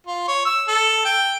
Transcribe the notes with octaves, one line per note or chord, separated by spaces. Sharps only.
F4
C#5
E6
A4
G5